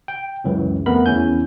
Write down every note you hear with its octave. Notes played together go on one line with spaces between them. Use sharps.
G5
C#2 F#2 E3
F2 A3 B3 A#4 B5
E2 C#4 E4 G#5 G6